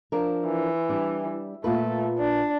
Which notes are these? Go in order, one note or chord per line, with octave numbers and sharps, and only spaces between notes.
F3 D4 A#4
E3
G3 D4
A#2 A3 F4 B4
D4